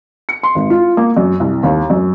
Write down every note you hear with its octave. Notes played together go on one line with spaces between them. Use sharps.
C#7
C6
G#1
F4
A#3
F#2
C2
D#2
F#2